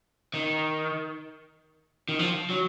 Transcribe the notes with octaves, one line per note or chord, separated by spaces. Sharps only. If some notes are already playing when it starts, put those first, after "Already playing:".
D#3
D#3
F3
F#3